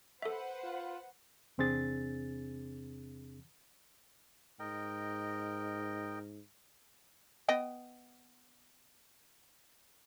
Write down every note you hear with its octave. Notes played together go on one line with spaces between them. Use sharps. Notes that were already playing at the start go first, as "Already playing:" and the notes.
A4 B4 C5 E5 F#5
F4
E2 C3 C4 D4 G#4 A6
G#2 A#4 D#5 G5
B3 D#5 G5